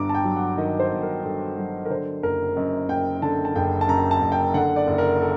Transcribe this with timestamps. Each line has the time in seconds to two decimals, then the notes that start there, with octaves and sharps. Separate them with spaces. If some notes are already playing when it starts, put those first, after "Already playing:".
Already playing: G1 G2 A#5 D6
0.09 A5
0.15 G5
0.25 F#3
0.36 F#5
0.58 D#3 D#5
0.79 C5
0.92 G1
1.03 A#4
1.23 G2 A4
1.58 F#3
1.85 A#4
1.90 D3 C5
2.23 F#1 A#4
2.56 F#2 D#5
2.89 F#1 G5
3.22 D3 A5
3.45 A5
3.55 F#1 G5
3.81 A5
3.88 F#2 A#5
4.11 A5
4.21 F#1
4.32 G5
4.54 D3 F#5
4.76 D5
4.87 F#1
4.98 A#4
5.20 A4